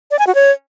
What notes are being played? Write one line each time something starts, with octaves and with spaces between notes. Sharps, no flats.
D5
G#5
F#4
C#5